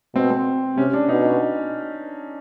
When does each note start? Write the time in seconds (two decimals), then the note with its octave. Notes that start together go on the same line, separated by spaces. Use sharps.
0.15 B2 C4
0.30 C4
0.78 C3 C#4
0.93 D4
1.09 B2 D#4